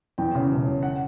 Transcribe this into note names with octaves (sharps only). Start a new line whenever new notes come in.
E2 G5
C#3
E1
E1
F#5